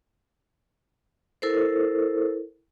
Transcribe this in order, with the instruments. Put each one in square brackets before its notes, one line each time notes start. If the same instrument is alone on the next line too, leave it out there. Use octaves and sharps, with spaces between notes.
[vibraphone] E4 A4 A#4 C5